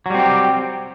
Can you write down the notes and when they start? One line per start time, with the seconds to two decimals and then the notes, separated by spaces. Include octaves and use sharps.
0.06 F#3
0.10 G3
0.14 C4
0.19 G4